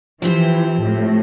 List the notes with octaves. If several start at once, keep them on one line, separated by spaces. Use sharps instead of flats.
E3 F3 C4 G4 C5
A2